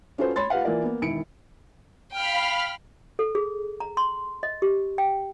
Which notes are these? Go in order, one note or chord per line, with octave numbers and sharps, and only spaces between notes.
C#4 F4 F#4 A4 B4 C5
C#5 B5 C6 A6
F4 G4 B4 F5 F#5
E3 A#3 F4 A#4 D5
A#3 B3
E1 D#3 E4 C#7 D7
F5 G5 B5 F6
A4
G#4
A#5
C6
D#5
G4
G5